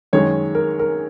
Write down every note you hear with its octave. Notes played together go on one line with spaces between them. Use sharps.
F#2 D#3 G#3 C#5
A#4
A#4